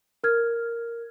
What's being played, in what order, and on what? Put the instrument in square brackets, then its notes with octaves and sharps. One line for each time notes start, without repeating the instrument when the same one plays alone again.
[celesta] A#4 F6 G#6